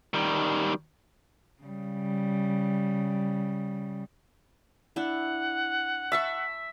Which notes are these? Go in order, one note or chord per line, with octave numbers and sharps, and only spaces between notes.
D#3 G3
C#3 G3
D4 E4 F#5
E5 A5 B5 C#6